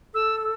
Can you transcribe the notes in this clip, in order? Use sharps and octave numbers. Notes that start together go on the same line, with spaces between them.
A4 E6